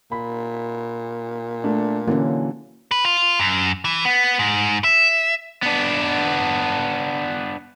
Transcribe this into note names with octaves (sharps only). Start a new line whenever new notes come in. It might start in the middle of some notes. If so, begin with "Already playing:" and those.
A#2 B5
A3 D4
D3 E3 F#3 A#3 C#4
B4
F4
F#2
E3
B3
G#2
E5
B3 D4